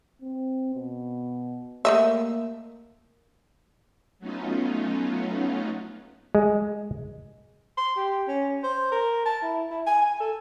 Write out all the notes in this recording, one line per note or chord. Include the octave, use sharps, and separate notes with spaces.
C4
B2
A3 A#3 D#5 E5
F#3 A3 B3 C#4 D#4 F4
G#3
C6
G4
C#4
C5
A#4
A5
E4
E4
G#5
G#5
A4